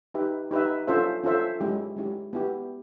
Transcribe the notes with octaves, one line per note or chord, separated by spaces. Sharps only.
D#4 G4 B4 E5
D#4 G4 B4 E5
C#4 F4 A4 C5 E5
C#4 F4 A4 C5 E5
G#3 C#4 E4 G4
G#3 C#4 E4 G4
B3 E4 G4